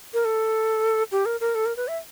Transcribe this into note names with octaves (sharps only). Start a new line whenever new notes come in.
A#4
A4
G4
A#4
A#4
A4
A#4
B4
E5